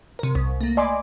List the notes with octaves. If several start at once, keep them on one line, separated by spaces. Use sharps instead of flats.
C3 A#4
C2
A3 A#3
D5 D#5 G#5 B5 C6 D6